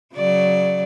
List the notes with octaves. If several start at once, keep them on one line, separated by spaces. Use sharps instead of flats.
C#3 F#3 D5